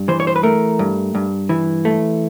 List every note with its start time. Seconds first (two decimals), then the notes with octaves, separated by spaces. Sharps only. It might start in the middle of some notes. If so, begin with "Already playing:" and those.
Already playing: G2
0.08 E3 C5
0.20 C#5
0.27 C5
0.36 B4
0.43 A3 A#4
0.79 G2
1.15 G2
1.49 E3
1.85 A3